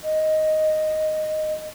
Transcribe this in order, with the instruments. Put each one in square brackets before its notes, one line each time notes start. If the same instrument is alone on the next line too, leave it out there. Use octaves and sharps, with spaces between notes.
[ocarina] D#5